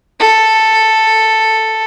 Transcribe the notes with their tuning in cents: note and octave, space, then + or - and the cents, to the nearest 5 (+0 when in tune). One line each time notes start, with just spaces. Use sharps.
A4 +5